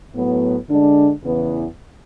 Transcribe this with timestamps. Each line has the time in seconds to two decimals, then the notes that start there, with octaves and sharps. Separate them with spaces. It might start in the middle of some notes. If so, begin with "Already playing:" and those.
0.14 A2 F#3 B3
0.67 D3 G#3 D4
1.22 E2 C#3 E3 B3